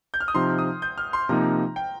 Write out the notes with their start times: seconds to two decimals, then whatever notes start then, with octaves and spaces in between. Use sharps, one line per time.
0.14 G6
0.20 F6
0.28 D#6
0.34 C3 F3 D#4 C6
0.59 D#6
0.82 G6
0.98 F6
1.13 C6
1.29 C3 F3 A#3 D#4 A#5
1.76 G5